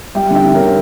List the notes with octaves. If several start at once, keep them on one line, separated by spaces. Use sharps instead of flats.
G3 E5 G5
D3 E5 G5
D3
D3 A#4 C#5